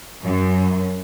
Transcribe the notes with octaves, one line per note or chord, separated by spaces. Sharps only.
F#2